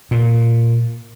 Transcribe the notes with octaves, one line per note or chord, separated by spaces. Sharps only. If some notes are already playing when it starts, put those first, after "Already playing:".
A#2